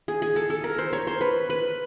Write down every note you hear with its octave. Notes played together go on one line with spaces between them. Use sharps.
G#4
G#4
A4
A4
A#4
C5
C#5
C5
B4
B4